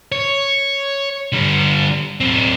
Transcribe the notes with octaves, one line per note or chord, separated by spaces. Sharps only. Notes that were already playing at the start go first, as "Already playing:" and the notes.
C#5
D3 G3
F#3 C4